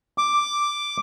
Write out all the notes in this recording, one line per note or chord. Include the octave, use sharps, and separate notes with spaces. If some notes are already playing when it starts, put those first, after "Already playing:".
D6